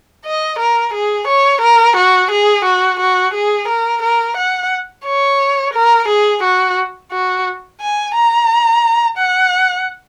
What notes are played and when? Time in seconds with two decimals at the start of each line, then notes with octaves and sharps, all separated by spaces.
0.25 D#5
0.59 A#4
0.94 G#4
1.28 C#5
1.62 A#4
1.97 F#4
2.31 G#4
2.65 F#4
3.00 F#4
3.34 G#4
3.68 A#4
4.03 A#4
4.37 F#5
5.06 C#5
5.74 A#4
6.09 G#4
6.43 F#4
7.12 F#4
7.81 G#5
8.15 A#5
9.18 F#5